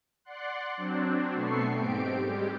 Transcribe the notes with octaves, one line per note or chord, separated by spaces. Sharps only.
D5 F#5 C6 F#6
F#3 C4 D4
B2 A3 B3 A4 C#6 C7
G#2 C4 G4 D7
G3 G#3 G4